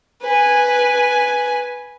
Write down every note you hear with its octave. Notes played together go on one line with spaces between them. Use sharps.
B4 G#5